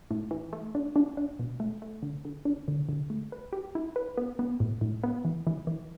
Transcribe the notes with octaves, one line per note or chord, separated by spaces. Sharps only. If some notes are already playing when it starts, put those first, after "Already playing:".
A2
E3
A3
D4
D4
D4
B2
A3
A3
D3
D3
D4
D3
D3
A3
B4
G4
E4
B4
B3
B3
A2
A2
B3
E3
E3
E3